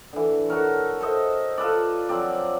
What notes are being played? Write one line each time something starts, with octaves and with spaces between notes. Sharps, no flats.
D3 E3
F#4 A4 A#4 C#5
A4 C5 D#5 E5
F4 A4 B4 D5
F3 F#3 C4 D5